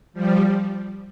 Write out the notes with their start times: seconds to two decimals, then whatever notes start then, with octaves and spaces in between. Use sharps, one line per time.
0.13 F3 G3